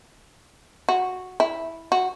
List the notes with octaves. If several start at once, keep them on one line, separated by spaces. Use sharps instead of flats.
F#4
E4
F#4